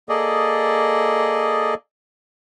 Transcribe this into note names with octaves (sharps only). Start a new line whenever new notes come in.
A#3 G#4 A4 D5 D#5